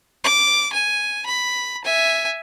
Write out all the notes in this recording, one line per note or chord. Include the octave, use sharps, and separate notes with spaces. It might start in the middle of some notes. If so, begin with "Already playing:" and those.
D6
G#5
B5
E5 G#5